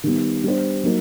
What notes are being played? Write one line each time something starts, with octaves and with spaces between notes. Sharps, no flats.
D#3 G3 B3
G3 B3 D4 G4 C5
F#3 A#3 D#4